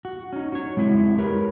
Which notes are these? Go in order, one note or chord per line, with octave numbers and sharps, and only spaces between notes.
F#4
C#4 D#4
F#4 C#5
G#3 C4 E4
G4 A#4 B4 C#5